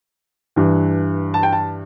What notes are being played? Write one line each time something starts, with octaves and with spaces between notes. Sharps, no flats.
G2 E3
A5
G5
A5